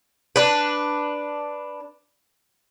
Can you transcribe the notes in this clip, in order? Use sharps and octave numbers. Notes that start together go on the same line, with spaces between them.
D4 B4